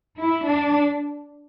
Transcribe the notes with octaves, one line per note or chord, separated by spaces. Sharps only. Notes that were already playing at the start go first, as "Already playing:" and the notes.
E4
D4